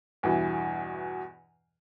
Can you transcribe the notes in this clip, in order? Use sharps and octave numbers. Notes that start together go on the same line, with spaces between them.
E2 G2 B2 E3